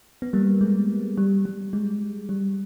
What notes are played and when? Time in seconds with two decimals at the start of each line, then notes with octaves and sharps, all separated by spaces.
0.22 B3
0.33 G3 A#3
0.61 G#3
1.18 G3
1.45 G3
1.73 G#3
2.29 G3